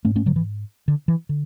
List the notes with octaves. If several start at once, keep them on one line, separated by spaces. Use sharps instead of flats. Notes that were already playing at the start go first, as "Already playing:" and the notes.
G#2 A3 C#4
A3 C#4
D3 F#3
E3
D3
E3
D3